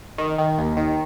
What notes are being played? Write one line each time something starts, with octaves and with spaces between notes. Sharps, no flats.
D#3
D#3
D#2
D#3